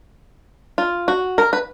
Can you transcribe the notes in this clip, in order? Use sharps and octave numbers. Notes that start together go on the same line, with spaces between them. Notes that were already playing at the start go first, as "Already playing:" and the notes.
F4
F#4
A#4
B4